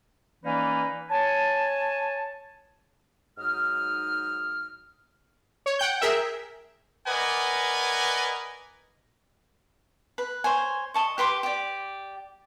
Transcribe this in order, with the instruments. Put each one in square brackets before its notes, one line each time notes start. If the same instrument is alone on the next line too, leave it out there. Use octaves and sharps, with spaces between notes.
[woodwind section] E3 A#3 C#4 D#4 B4 D5
C#5 G#5 A5
G#2 F#3 D#4 D#6 F6
[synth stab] C#5
F#5 G5 G6
G#4 A#4 E5 G5
[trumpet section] A#4 B4 D5 D#5 F#5 G#5
[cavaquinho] B4
C5 C#5 G#5
D#5 A5 C#6
G4 B4 C6 D6
G4 D5